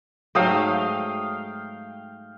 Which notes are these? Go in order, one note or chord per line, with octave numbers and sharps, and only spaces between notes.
G#2 F#3 A3 F5 G5 D#6